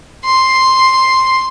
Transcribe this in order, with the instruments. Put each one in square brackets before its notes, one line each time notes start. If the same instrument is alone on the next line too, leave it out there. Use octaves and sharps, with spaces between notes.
[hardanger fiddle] C6